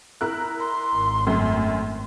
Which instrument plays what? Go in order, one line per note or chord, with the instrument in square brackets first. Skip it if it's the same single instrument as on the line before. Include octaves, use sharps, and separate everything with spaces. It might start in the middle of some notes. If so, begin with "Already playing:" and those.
[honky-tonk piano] E4 A#4 F#6
[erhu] C6
[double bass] G#1
[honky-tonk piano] F#2 A2